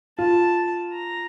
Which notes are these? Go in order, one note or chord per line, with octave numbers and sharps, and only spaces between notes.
F4 A5
A#5